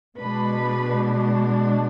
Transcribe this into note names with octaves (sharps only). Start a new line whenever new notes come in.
B2 G#3 D4 B4